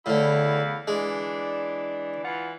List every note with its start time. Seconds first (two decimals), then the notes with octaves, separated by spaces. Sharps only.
0.06 E2 A2 D3 E4 F5
0.88 E3 G#3 D4
2.23 E3 F4 F#5